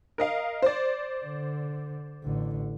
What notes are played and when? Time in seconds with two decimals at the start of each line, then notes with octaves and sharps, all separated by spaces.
0.18 A#4 D#5 F5
0.62 C5 D5
1.25 D3
2.24 A1 D3